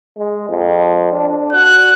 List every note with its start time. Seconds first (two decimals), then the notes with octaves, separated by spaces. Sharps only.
0.18 G#3
0.49 F2
1.12 D4
1.53 F#4 F#6